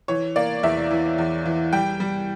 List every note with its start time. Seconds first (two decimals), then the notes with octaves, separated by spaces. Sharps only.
0.08 E3 C#5
0.36 A#3 D5
0.63 E2 E5
0.91 E3
1.18 E2
1.45 E3
1.73 G3 G5
2.00 G3